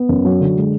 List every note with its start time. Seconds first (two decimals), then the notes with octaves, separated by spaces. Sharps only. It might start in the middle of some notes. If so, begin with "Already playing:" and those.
Already playing: B3
0.09 F#2
0.25 F#3
0.40 D3
0.56 G#3